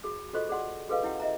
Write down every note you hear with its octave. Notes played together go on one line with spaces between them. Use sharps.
F#4 G#4 D#6
F4 F#4 A4 C5 D#5 C#6
G#4 D5 F#5 C6
F#4 G#4 A4 B4 D#5 F5
C#4 E4 G4 F#5
D#5 E5 A#5